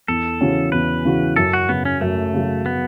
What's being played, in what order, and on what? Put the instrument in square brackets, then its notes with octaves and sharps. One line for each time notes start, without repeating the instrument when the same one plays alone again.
[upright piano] E2 [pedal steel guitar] A4
[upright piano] C#3 E3 C#4 F#4
[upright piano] E2 [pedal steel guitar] B4
[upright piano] C#3 E3 C#4 F#4
[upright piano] F#2 [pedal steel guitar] A4
[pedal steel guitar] F#4
[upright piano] C#3 F#3 [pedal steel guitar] B3
[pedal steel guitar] C#4
[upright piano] F#2 [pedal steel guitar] A3
[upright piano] C#3 F#3
[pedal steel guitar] B3